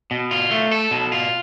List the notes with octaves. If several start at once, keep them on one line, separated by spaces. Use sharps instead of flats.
B2
F4
A3
A4
B2
F4